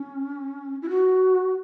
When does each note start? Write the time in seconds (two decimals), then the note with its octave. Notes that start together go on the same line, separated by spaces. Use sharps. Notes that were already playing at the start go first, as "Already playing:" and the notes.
Already playing: C#4
0.82 E4
0.89 F#4